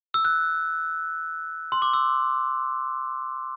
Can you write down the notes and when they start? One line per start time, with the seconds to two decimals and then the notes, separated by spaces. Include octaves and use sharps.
0.14 E6
0.25 F#6
1.72 C6
1.82 D6
1.94 E6